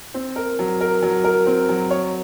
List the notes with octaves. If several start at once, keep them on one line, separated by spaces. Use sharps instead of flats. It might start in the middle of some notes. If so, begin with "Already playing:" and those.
C4
A#4
F#3
A#4
F#3
A#4
C4
F#3
C#5